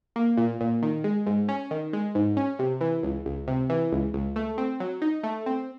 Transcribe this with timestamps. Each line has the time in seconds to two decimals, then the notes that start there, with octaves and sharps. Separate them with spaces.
0.16 A#3
0.37 A#2
0.61 A#2
0.82 D#3
1.04 G#3
1.26 G#2
1.49 C#4
1.71 D#3
1.93 G#3
2.15 G#2
2.37 C#4
2.59 C3
2.81 E3
3.03 C#2
3.25 C#2
3.47 C3
3.69 E3
3.92 C#2
4.14 C#2
4.36 A3
4.58 C4
4.80 F#3
5.02 D#4
5.23 A3
5.46 C4